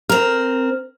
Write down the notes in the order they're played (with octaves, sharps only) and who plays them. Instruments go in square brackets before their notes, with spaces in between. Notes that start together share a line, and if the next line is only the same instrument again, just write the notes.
[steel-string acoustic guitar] C4 A#4 [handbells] F6